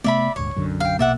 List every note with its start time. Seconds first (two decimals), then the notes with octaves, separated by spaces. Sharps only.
0.04 C3 A3 B3 D5 E5 B5
0.36 D#1 D2 G#2 C#5
0.55 B1 F#2 D3
0.80 F5 G5
0.99 A#1 B2 A#3 D5 E5 F#5